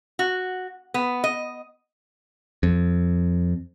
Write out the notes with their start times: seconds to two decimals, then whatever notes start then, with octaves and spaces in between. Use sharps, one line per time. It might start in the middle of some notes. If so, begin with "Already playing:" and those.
0.19 F#4
0.94 B3
1.24 D#5
2.63 F2